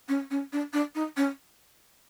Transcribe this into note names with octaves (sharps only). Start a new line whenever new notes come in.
C#4
C#4
D4
D4
D#4
C#4